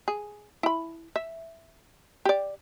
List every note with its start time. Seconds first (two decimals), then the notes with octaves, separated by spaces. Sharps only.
0.08 G#4
0.63 E4 B5
1.16 E5
2.25 G4 D5